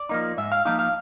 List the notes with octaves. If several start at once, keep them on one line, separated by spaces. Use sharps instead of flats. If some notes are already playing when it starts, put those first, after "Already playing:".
Already playing: D5
F3 A#3 D#4
G#2 E5
F5
F3 A#3 D#4 F5
F5